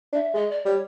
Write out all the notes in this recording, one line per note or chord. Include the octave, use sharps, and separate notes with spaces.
D4 E5
G#3 D#5
D5
G3 C#5